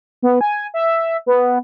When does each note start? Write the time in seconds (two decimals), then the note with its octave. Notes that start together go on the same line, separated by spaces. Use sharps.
0.23 B3
0.41 G#5
0.74 E5
1.26 B3